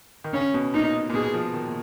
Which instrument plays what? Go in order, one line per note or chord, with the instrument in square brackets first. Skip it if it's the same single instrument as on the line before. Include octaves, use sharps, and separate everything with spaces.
[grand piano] D#3
[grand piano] C#3 [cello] C#4
[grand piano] B2
[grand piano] A#2 [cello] D#4
[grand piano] A#2
[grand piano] B2 [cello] G#4
[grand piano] F3
D#3
A#2